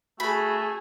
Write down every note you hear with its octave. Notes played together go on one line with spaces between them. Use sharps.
A3 F#4 G#4 B5